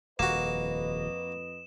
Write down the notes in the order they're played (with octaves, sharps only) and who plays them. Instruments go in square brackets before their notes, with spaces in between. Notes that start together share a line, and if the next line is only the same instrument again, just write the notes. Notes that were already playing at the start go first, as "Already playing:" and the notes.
[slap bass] D#1 [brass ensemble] F2 B4 D#5 [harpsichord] A#3 F#4 [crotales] E7